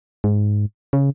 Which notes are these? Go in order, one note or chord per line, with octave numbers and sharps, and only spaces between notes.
G#2
C#3